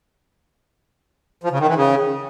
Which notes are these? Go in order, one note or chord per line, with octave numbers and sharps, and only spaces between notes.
F3
C#3
D#3
E3
C#3